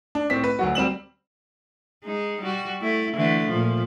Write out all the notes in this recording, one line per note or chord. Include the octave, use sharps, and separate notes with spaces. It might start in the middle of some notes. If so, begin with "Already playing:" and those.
D4
A2 C4 B6
B4
D2 F#3 F#4
G3 C4 E7 F#7
G#3 D#4
G3 F#4
A3 E4
D3 E3 A3
A#2 F3